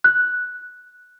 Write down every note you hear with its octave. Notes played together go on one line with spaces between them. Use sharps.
F#6